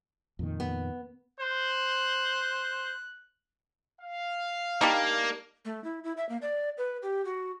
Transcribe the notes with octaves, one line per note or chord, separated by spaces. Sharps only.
F2 A#2 D#3
B3
C5 F#6
F5
G3 A#3 D4 D#4
A3
E4
E4
E5
A#3
D5
B4
G4
F#4